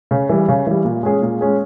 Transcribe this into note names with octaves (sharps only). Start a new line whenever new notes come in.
C#3
E3 G3
C#3
E3 G3
A#2
G#3 C#4 G#4
A#2
G#3 C#4 G#4